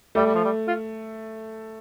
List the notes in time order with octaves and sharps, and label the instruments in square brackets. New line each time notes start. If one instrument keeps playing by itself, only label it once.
[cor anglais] G3 [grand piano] A3
[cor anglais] G3
F3
G3
F4